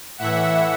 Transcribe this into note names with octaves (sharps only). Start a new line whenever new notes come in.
A2 E3 E5 F#5